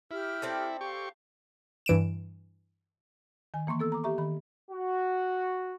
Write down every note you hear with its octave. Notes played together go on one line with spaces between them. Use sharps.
E4 G4 F6
C4 A4 D5
G4 F5 C#6
G2 E3 D7 E7
D#3 G#5
E3 A#3 C6 C#6
B3 A4 E6
A#5 D6
G4 E5 A#5 C#6
D#3 B5
F#4